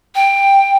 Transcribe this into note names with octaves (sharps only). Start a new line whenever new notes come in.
G5